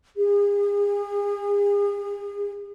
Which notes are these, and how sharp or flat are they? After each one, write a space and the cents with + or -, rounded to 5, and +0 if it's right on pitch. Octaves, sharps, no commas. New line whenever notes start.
G#4 -40